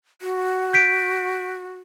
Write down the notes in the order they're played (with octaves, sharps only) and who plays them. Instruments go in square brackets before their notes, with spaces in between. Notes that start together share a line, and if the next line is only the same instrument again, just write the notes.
[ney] F#4
[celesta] G6 B6 D7